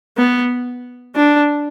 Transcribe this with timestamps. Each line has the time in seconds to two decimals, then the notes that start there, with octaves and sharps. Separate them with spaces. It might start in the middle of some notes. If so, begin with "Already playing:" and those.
0.17 B3
1.16 D4